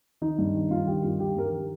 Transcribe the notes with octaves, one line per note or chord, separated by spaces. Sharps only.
D#3 D#4
G2
D#3
G2 F4
D#3 G4
G2 F4
D#3 G4
G2 A#4
G4
D#3